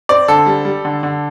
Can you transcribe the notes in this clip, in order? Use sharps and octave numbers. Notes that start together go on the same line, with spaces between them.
C4 D5
D3 A4
G3
G3
D3
D3